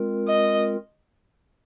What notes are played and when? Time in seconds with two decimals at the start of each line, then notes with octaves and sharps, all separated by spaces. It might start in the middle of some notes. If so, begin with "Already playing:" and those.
Already playing: G#3 C4 F4 A#4
0.28 D#5